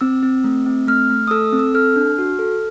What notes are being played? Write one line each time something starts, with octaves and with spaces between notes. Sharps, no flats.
C4 E6
C4
A3
C4
A3 F6
A3
D#6
A4 E6
C4
E6
A4 F6
D4
F#4
A4